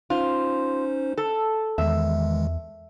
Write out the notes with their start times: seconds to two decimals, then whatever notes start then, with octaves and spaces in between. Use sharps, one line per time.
0.10 C#4 D#4 F4 C5
1.18 A4
1.78 E2 D#3 E3 G#3 E5